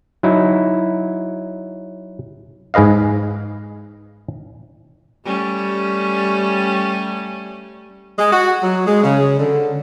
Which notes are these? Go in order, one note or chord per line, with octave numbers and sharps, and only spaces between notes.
F#3 D#4 E4
G#2 G#4 B4 D#5 F5
G3 A3 C#4
G#3
F#4
F#3
G#3
C#3
D3